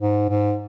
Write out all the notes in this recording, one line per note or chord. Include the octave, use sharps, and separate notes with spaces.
G#2
G#2